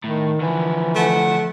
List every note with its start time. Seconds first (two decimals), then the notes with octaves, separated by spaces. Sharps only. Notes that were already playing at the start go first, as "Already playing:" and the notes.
0.04 A2 D#3
0.41 D3 E3 F3
0.95 A3 F#5